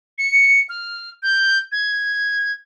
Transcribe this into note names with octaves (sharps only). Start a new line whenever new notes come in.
C#7
F6
G6
G#6